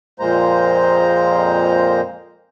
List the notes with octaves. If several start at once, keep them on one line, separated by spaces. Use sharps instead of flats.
F2 A#2 G#3 A#3 C5 A#5